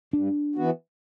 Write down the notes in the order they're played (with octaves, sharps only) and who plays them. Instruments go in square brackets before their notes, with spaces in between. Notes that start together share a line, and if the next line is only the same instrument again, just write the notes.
[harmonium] G2 [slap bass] D4
[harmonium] E3 B3 F#4